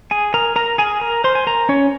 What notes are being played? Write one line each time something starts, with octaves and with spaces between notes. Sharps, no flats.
G#4 G#5
A#4 A#5
A#4 A#5
G#4 G#5
A#4 A#5
C5 C6
G#5
A#4 A#5
C#4 C#5